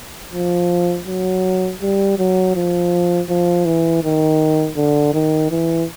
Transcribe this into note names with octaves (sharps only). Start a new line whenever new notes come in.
F3
F#3
G3
F#3
F3
F3
E3
D#3
D3
D#3
E3